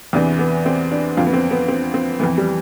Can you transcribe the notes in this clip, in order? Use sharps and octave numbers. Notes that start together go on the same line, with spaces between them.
E2 C3 E3 D4
B3
C4
D4
F2 D3 F4
B3
C4
B3
C4
C4
F2 E3 B3
G3